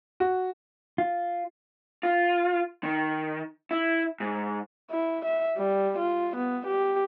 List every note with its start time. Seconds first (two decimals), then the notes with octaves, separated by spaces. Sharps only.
0.20 F#4
0.98 F4
2.03 F4
2.83 D#3
3.71 E4
4.20 G#2
4.91 E4
5.25 E5
5.58 G3
5.99 F4
6.36 B3
6.67 G4